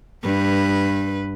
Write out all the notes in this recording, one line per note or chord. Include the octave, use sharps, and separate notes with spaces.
G2 B4